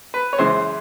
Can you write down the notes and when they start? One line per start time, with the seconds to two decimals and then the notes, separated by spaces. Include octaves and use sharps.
0.14 B4
0.33 C#5
0.39 F#2 C#3 E3 G#3 C5